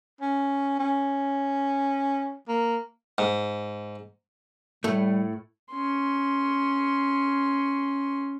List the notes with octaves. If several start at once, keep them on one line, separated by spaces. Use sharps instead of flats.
C#4
C#4
A#3
G#2
A2 G3 A3
C#4 C6